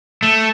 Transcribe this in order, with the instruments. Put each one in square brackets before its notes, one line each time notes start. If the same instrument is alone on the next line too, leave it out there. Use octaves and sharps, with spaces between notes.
[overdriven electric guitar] A3